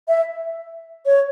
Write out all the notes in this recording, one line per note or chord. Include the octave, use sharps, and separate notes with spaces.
E5
C#5